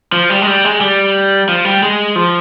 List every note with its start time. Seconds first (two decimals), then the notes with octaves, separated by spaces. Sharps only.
0.12 F3
0.30 G3
0.42 G#3
0.47 G3
0.64 G#3
0.81 G3
1.49 F3
1.65 G3
1.83 G#3
2.16 F3